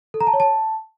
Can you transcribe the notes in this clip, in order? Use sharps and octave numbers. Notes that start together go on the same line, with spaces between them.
A4
A#5
A5
C#5
A5